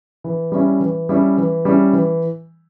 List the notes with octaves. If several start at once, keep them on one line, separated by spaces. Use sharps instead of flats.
E3
G3 C#4 E4
E3
G3 C#4 E4
E3
G3 C#4 E4
E3